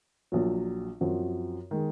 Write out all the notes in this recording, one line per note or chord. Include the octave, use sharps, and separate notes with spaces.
A#1 A#2 F#3
F#2 F3 C4 F#4
D#3 G#3